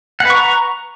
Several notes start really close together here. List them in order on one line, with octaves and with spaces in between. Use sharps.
F#5 B4 C#6 A#5